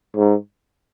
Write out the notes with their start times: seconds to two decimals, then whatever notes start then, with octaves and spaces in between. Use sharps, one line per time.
0.16 G#2